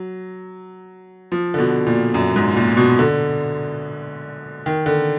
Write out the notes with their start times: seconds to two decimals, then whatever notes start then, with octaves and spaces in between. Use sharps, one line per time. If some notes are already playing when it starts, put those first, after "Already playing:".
Already playing: F#3
1.32 F3
1.54 D3
1.58 B2
1.86 A#2
2.14 F#2
2.36 G#2
2.56 A#2
2.77 B2
2.99 D3
4.66 D#3
4.86 D3